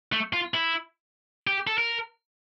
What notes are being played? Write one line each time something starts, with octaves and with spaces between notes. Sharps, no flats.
A3
F4
E4
G4
A4
A#4